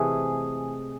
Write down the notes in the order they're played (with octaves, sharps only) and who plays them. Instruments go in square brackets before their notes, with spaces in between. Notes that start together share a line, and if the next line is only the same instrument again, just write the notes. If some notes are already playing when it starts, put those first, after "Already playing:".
Already playing: [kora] C3 E3 A3 [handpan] G#4